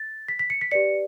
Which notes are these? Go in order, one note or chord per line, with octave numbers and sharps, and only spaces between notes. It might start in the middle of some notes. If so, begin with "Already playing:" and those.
Already playing: A6
B6
B6
C#7
B6
G4 B4 D5 C#7